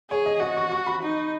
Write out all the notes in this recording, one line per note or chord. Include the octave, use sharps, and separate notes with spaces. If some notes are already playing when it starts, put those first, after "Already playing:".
G#4 C#5
D#5
F#4 D#5
C#6
C#6
B5
D#4